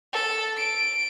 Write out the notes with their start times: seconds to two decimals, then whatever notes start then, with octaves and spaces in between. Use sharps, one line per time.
0.13 A4
0.57 D7